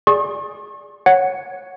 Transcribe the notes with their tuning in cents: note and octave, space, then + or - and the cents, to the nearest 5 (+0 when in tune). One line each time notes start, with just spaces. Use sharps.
G#4 +0 D5 -5 C#6 -45
C#5 +0 F#5 +0